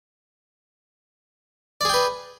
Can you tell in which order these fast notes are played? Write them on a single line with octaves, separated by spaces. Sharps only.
D5 G#4 G5 B4